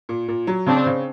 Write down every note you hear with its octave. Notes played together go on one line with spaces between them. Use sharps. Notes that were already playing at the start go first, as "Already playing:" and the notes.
A#2
A#2
F#3
C#3 C4 D4
C#3